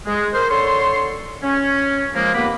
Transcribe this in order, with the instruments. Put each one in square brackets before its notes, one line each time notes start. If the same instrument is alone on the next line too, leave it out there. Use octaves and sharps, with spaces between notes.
[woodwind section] G#3
A#4 C5
D3 A4 C#5 C6
C#4
F3 G#3 A#3
D#2 A#3 B3 B4 B5 D6